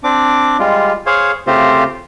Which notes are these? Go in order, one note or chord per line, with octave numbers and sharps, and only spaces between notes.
C4 D4 D6
G3 G#3 F4
G#4 C5 C#5 F5
C#3 A3 C4 F4 G4 C5